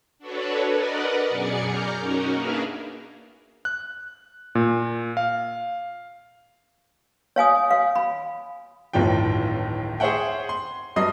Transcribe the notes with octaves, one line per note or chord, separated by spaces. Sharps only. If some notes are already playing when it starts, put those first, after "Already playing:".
D4 F#4 A4 B4 C#5
A#4 B4 D5 D#5 F#5
F#2 B2 G#4 D5 G#5 C#7
A#5 D6 F6 G6
C#4 D#4 F#4 A#4
A#3 D4 G#4 B4 E5 F5
F#6
A#2
F5
C#5 F5 G#5 D#6
F5
B5
D1 G1 A2 D#3 F3 G5
G#4 C5 C#5 E5 F#5 G5
C6
G2 F#3 D#5 D#6 C7